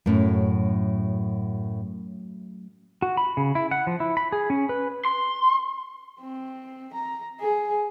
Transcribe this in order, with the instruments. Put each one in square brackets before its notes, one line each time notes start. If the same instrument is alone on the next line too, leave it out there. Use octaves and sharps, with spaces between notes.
[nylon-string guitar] F#2 A2 [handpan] F#3 A3 C#4
[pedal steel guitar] F#4
B5
C#3
E4
F#5
F3
E4
B5
G#4
C#4
B4
[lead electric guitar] C6
[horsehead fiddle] C4
A#5
G#4